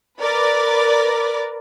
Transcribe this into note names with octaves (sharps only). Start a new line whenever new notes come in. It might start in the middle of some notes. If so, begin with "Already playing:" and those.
A#4 B4 D5